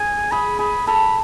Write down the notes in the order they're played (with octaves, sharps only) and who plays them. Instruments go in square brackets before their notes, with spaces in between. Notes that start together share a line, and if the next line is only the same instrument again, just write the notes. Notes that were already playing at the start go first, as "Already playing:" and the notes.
Already playing: [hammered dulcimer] G#4 [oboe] G#5
[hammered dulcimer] G#4 [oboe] B5
[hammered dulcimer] G#4 [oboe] B5
[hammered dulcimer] A4 [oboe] B5